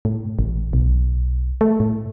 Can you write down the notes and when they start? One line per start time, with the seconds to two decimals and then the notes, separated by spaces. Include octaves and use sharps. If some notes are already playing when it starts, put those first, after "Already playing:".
0.05 A2
0.39 A1
0.73 B1
1.61 A3
1.80 A2